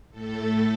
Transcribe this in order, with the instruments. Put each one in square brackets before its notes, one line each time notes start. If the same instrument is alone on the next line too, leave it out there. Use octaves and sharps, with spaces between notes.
[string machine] A2 A3 A4